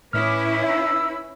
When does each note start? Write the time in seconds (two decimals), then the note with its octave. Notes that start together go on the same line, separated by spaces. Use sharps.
0.13 A2 C#4 E4 B4 D6 D#6 F6
0.64 E5 B5 E6